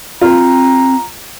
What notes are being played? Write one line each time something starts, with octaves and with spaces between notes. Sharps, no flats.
C4 F4 A#5